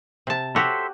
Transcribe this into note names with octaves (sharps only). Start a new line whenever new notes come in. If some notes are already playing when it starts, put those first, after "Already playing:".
C3 A5
F#4 G4 A4 C5 C#5 E5